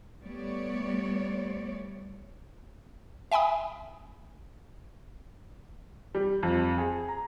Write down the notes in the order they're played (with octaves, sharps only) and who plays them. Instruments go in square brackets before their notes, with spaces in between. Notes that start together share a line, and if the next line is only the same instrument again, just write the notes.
[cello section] G3 A3 B3 C#5 D5
[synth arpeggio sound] E5 G5 G#5 B5 D#6
[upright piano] G3
F2
G#4
A#5